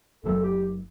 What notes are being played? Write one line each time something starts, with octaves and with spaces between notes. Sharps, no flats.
F#1 F#2 F#3 A3 A4
G4